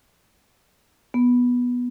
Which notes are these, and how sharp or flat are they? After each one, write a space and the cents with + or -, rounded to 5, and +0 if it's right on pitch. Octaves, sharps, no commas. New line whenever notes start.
B3 -10